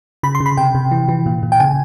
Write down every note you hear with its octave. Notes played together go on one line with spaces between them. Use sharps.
C#3 B5
C6
C#3
B5
C3 G5
C3
E3
E3
A#2
A#2
G5
C#3 G#5